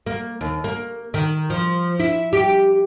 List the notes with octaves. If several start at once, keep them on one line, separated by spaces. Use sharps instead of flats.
A#3
D#2
A#3
D#3
F3
E4
G4